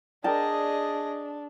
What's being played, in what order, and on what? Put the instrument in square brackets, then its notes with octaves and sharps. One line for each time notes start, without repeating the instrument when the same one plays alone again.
[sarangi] D4 [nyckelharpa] G#4 D#5 [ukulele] A#4 D5 G5 [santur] A5